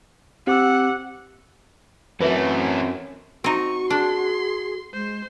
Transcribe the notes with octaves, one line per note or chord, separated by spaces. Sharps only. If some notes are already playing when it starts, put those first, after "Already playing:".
C4 G4 F#5 D6 E6
F#2 E3 A3 C4 F4 A4 B4 E5
C4 D#4 F#4 C#6
D4 G#4 C6
G#3 C5